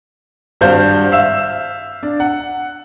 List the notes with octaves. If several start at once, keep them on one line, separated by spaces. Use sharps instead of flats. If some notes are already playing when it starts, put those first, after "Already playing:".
G#1 G2 C5 F5 G6
E5 F5 E6 E7
D4
F#5